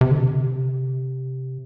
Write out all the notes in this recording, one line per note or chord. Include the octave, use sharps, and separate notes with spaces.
C3
D3
C3